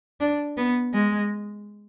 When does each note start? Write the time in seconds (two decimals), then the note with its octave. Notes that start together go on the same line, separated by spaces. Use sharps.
0.20 D4
0.57 B3
0.93 G#3